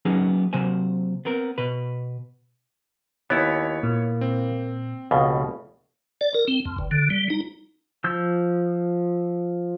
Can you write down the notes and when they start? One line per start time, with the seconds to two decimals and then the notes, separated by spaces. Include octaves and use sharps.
0.05 F#3 A#3 B3 C#4 D#4 G#4
0.53 C3 F#3 A#3 C5 G#5
1.25 B3 C4 A#4
1.58 B2 B4
3.30 D#2 B3 E4 C#5
3.83 A#2 A#3
4.21 C4
5.11 F1 C#2 B2 F5
6.21 D5
6.34 A#4
6.48 C4
6.65 F2
6.78 G1
6.91 D3
7.10 G3
7.30 D#4
8.04 F3 E6 G6